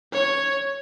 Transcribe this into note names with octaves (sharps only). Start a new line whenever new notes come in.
C#5